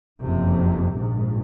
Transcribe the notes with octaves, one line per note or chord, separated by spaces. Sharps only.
F#1 F2 C3
A#1 G#2